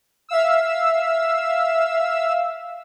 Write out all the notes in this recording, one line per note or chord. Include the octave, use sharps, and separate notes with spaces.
E5 F5 E6